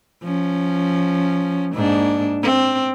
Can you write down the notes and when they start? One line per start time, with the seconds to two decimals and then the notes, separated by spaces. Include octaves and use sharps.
0.23 F3 C#4
1.74 G#2 A#3 D4
2.43 C4